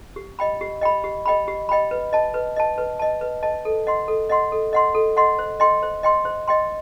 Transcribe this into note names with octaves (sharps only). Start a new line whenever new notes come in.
G4
D#5 G5 B5
G4
D#5 G5 B5
G4
D#5 G5 B5
G4
D#5 G5 B5
B4
D#5 A5
B4
D#5 A5
B4
D#5 A5
B4
D#5 A5
A4
D#5 F#5 C6
A4
D#5 F#5 C6
A4
D#5 F#5 C6
A4
D#5 F#5 C6
C5
D#5 G5 C6
C5
D#5 G5 C6
C5
D#5 G5 C6